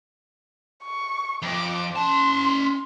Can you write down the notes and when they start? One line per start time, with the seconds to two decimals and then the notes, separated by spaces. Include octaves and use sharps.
0.84 C#6
1.42 F2 D6
1.95 C#4 A5 C6